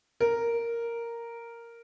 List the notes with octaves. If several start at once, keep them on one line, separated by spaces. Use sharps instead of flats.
A#4